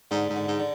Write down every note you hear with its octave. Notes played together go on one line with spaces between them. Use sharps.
G#2 D3
G#2
D3
G#2
D3